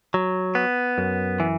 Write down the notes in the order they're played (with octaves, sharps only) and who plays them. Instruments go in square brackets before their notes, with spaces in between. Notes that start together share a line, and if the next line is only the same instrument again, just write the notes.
[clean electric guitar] F#3
B3
F#2
E3